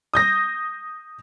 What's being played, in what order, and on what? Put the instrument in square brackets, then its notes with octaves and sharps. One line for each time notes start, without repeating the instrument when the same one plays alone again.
[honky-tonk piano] D#6 G6 A#6